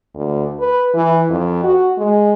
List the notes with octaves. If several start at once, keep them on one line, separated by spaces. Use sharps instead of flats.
D2
B4
E3
F2
F#4
G#3